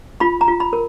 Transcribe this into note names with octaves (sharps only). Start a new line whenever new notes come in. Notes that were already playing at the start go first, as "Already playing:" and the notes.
F4 B5
A#5
F4
B5
A#4